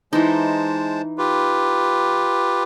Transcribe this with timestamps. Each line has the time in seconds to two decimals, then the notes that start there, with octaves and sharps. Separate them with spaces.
0.13 E3 G#3 D#4 C5 A5
1.18 F4 G4 B4